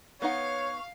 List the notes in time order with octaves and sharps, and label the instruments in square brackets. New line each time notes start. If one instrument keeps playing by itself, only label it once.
[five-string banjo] B3 D#4 F#5 [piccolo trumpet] C#5 [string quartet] F5 [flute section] C#6